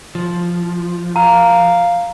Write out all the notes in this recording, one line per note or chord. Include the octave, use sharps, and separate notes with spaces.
F3
F5 A#5